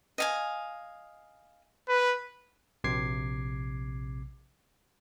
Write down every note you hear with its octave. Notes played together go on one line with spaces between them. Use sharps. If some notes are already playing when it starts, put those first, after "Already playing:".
D#5 F5 G#5
B4
A#1 C3 D6 G#6 C7